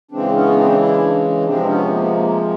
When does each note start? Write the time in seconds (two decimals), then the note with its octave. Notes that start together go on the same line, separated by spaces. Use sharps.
0.11 C#3 E3 G#3 C4 D4
0.34 B3 C#4
0.56 C4 D4
0.78 D4 E4
1.45 C3 F3 G#3 C4 D4
1.68 B3 C#4
1.90 A#3
2.05 B3
2.13 A#3